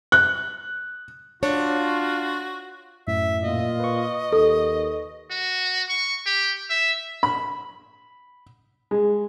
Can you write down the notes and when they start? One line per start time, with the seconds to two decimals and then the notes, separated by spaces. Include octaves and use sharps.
0.12 F#6
1.43 D4 F4 F#4 C#5
3.08 F#2 A2 E5
3.44 A#2 F4 D#5 F5
3.80 B4 C#6
4.32 D#2 A4
5.30 F#4
5.89 C#6
6.26 G4
6.69 E5
7.23 B5
8.91 G#3